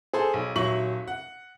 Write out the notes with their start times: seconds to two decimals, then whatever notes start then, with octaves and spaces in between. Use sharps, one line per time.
0.13 G#4 A4 C5
0.34 B1
0.55 D#1 F#3 E5 C#6 F#7
1.08 F#5